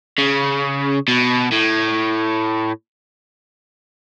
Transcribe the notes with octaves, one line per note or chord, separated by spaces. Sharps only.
C#3
B2
A2